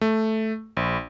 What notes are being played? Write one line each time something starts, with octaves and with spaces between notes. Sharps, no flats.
A3
A#1